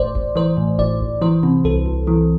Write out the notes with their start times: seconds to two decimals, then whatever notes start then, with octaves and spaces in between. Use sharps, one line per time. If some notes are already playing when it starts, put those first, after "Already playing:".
Already playing: A1 A2 C5 D5
0.15 A1
0.36 E3 C5
0.57 A2
0.79 A1 D5
1.01 A1
1.22 E3 C5
1.43 C3
1.64 C2 A4
1.86 C2
2.07 E3